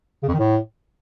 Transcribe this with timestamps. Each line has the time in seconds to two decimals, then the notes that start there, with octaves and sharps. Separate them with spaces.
0.23 C#3
0.28 F2
0.34 D#3
0.39 A2